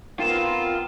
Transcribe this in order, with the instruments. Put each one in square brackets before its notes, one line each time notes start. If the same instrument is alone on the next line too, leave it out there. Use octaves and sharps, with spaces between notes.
[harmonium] B3 C4 A#4 [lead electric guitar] F4 F5 [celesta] G5 E7